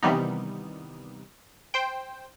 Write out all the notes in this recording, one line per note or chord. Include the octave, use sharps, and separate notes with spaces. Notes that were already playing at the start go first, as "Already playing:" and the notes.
C3 D#3 E3 G3 B3 D#4
C5 G5